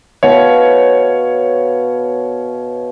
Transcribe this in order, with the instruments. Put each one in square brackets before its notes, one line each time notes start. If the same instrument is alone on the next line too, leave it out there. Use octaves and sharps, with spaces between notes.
[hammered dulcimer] B2 F5 [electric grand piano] C#5